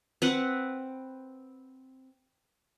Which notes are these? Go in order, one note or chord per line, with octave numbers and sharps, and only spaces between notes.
C4 B4 F#5